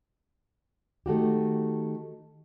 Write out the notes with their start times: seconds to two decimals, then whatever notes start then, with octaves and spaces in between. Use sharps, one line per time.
1.06 D#3 A3 F#4 G4